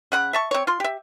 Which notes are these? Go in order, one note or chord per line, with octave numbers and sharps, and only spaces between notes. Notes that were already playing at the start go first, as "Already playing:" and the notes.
C#3 F#5 B5
E5 A5 C#6
C4 C#5
F4 C6
G4 E5